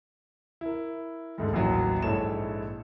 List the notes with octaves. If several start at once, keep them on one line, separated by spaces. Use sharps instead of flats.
E4 A#4
D2 G#2 D3
A1 D#2 E3 F#3
A#1 G#2 E4 A4 C#5 E7